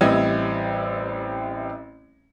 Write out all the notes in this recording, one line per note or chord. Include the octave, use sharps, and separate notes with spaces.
A1 G3 C4 E4 D#5 G#6